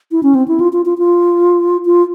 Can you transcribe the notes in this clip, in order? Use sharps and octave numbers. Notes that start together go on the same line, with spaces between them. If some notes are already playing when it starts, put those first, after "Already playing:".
E4
C#4
C4
E4
F4
F4
F4
F4
F4